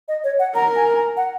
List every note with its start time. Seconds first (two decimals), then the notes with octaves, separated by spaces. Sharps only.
0.08 D#5
0.24 C#5
0.39 F#5
0.55 A#4 A#5
0.76 G#5
0.96 A#5
1.17 F#5